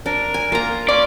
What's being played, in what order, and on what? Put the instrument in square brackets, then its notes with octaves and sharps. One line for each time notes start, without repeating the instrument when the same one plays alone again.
[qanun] D4 [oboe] A#4
[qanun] G#5
[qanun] A#3 A#5 [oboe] F4
[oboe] C#4 [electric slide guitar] D5 [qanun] C6